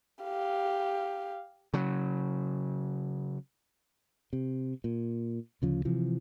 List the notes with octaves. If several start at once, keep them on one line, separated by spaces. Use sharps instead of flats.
G4 F5
C#3 F#3
C3
A#2
D2 C#3 F3
C3 E3 F3